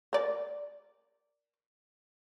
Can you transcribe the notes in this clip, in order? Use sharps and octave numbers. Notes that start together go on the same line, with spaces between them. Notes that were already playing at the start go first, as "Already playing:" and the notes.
A#4 D5